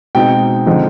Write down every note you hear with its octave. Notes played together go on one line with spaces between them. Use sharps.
B2 G#3 C4 D#4 G5
D3 F3 G#3 C4 D#4